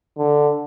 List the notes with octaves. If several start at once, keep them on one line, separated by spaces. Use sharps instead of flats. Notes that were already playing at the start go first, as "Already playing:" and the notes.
D3